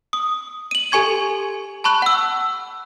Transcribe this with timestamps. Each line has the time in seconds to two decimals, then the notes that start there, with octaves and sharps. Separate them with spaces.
0.13 D#6
0.71 D#7 F#7
0.91 G4 A4 G#5 C#6 G#6 D#7
1.84 A5 B5 C#6 F#6
2.02 F#5 E6